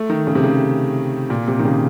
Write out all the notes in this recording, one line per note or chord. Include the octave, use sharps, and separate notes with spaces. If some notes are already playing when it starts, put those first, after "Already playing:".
Already playing: A3
D#3
C#3
C3
C#3
A#2
C3
D#3
C#3